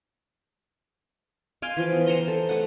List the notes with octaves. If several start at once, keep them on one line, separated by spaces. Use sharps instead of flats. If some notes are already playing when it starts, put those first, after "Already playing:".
F5 G5 G#5 C6
E3 F3 B4
B3
C5 F#5 A#5 C6
A4
A3 B4 F#5